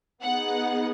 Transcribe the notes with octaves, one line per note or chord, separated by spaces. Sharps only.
B3 D#4 G#4 F#5